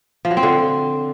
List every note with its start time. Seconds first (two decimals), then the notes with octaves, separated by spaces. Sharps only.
0.25 F3
0.31 F#3
0.37 C4
0.43 D3